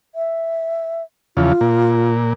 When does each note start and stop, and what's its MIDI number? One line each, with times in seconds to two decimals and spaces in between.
0.15 1.02 76
1.37 1.53 40
1.37 1.53 49
1.37 1.53 53
1.37 2.13 65
1.61 2.33 46